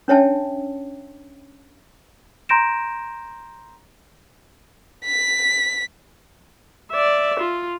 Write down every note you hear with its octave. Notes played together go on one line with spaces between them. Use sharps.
C#4 D4 C#5 E5 G5 A5
A#5 C6 G6 A#6 D7 E7
B6
D5 E5
F4